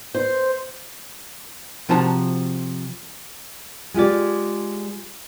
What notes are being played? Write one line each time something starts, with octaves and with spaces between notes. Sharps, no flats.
C5
C3 F3 F#4 A5 A#5
G#3 F4 G4 D5